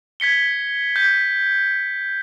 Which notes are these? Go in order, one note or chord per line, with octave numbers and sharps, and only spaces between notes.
G#6 B6 C#7 G7
G6 B6